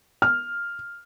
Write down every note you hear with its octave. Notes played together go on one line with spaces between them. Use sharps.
F6